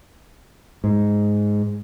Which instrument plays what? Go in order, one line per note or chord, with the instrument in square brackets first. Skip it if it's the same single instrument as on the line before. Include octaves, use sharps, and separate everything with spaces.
[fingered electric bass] G#2